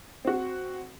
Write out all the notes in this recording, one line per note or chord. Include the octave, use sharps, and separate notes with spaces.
C4 F#4